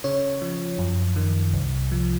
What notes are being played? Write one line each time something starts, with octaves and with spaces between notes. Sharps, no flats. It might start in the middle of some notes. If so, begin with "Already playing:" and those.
C#3 C#5
F3
F#2
D#3
C2
F3